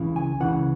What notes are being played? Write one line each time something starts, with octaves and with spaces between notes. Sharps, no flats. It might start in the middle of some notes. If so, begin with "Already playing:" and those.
Already playing: C#2 C#3 E3
G#5
C#2 C#3 E3 F#5